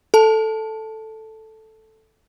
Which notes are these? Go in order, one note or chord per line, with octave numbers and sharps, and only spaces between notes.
A4 A5